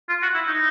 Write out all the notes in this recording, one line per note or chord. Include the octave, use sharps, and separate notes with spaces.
F4
F#4
E4
D#4